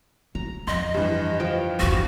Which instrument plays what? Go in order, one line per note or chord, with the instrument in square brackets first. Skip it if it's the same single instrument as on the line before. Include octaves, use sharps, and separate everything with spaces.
[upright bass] F#3 [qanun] A#5
[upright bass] F2 [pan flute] D#5 [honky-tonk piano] C6
[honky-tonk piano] G2 E3
[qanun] F3 G5
[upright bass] G1 E2 [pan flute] F#4